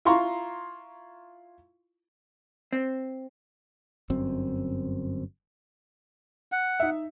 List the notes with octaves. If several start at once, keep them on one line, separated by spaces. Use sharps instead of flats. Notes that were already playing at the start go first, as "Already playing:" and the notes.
E4 F4 F5 A#5 C6 C#6
C4
G1 F#2 C4
F#5
D#4 E5